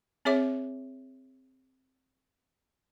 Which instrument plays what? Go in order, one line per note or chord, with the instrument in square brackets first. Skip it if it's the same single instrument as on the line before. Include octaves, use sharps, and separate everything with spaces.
[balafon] C4 G#4 C#5 E5 D6